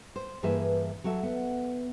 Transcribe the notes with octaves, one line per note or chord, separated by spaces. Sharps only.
C5
G2 E3 A#3 G#4 B4 E5
F#3 F#4 A4 E5
B3